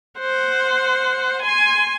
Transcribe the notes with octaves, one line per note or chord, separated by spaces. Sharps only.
C5 F#5
G#5 C6